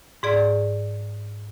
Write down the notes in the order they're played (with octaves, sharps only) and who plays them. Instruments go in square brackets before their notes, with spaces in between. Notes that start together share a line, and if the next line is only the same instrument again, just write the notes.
[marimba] G#2 G#4 D5